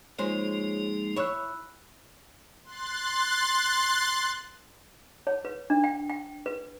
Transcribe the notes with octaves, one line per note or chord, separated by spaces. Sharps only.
F3 G#3 A#3 D#4 F4 C5 C#5
E4 C#5 B5 E6 F#6
C6 F#6 A6
C#5
B4
D4
G5
G5
B4